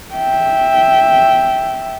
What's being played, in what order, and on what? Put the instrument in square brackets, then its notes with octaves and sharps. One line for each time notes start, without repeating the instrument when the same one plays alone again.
[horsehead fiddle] E5 G5